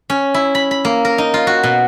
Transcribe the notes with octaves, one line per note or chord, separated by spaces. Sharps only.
C#4
E4
B5
B5
A#3
A#4
D#4
F4
F#4
B2